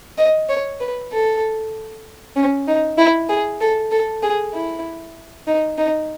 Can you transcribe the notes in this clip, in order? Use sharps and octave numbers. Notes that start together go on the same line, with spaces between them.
D#5
C#5
B4
A4
C#4
D#4
E4
G#4
A4
A4
G#4
E4
D#4
D#4